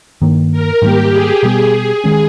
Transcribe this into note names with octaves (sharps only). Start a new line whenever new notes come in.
G2 D#3 A#3
A#4
G#2 D#3 G3 A#3 G4
G#4
B2 G3 B3
G#4
D#3 G#3 C#4